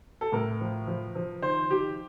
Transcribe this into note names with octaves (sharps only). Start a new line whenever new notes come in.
A4
A2 A#4
F3
F3
F3
D#3 C5
D#3 G4